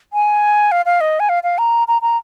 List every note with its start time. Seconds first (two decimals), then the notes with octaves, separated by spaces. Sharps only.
0.13 G#5
0.72 F5
0.86 F5
1.01 D#5
1.20 G#5
1.29 F5
1.43 F5
1.58 A#5
1.88 A#5
2.02 A#5